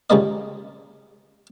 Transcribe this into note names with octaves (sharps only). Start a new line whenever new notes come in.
C#2 C#3 G3 A#3 D#5